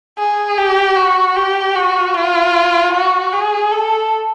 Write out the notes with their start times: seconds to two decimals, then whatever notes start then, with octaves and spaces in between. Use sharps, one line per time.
0.19 G#4
0.58 G4
0.96 F#4
1.36 G4
1.75 F#4
2.15 F4
2.94 F#4
3.33 G#4
3.72 A4